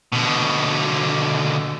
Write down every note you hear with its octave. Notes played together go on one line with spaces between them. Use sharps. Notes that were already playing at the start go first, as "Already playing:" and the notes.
B2 D3